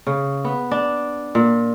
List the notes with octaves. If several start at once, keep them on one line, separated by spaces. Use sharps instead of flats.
C#3
B3
D4
A#2